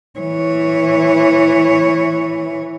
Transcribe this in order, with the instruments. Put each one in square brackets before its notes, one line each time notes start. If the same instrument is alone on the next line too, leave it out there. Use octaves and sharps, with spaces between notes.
[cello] E3 C#5